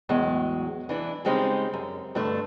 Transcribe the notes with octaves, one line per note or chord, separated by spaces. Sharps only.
E2 A2 F#3 G#3
E3 D4 E4
C#3 G3 G#3 C4 C#4 D#4
F#2
G2 D3 A3 D4